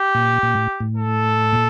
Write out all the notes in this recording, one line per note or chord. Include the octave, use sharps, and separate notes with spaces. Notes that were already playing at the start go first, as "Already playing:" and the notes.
Already playing: G4
A#2
A#2
A2
A2
A4
A#2